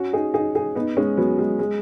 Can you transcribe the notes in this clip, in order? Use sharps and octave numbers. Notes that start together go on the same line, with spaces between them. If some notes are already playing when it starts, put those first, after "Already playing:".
Already playing: C#4 F#4
D#4 G#4
D#4 G#4
D#4 G#4
B3 D#4
G#3 C#4
F#3 B3
G#3
G#3